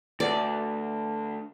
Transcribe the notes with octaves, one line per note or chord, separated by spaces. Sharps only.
D2 B4 D5 F#5 A5